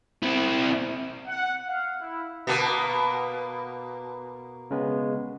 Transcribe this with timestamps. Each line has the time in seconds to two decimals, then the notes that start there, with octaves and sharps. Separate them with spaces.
0.23 C4 E4
1.26 F#5
1.67 F5
1.99 E4
2.47 B2 A#3 A#5 D6
4.71 C#3 G#3 B3